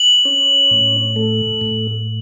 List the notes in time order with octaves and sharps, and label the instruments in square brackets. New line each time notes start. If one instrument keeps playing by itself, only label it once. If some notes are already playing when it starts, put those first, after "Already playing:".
Already playing: [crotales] F#7
[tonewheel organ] C#4
A2
A3
A2